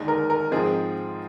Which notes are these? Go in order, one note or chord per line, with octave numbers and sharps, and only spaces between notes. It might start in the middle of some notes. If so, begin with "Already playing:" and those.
Already playing: D#2 D3 G#3 D#4
A#4
A#4
G#2 F3 C4 G#4